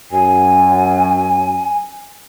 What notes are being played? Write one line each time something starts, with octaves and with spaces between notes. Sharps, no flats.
F#2 G#5